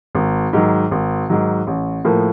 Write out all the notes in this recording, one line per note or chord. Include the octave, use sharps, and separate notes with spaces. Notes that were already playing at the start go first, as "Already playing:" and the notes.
G#1
G#2 D#3 F#3
G#1
G#2 D#3 F#3
A1
A2 F3 A#3